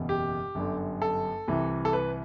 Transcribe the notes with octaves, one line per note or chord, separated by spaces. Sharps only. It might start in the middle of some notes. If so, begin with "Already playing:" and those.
Already playing: F#1 E2 B2
G4
G1 F#2 D3
A4
C2 C3 E3
A4
B4